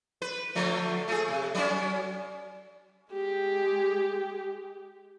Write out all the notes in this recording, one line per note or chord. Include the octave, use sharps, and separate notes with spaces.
B4
D3 F3 A3
A3 G#4
C3
F#3 C#4
G#3 G4